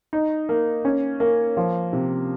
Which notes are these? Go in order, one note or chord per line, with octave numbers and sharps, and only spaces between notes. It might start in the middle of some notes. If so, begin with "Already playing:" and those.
D#4
A#3
C#4
A#3
F3
C3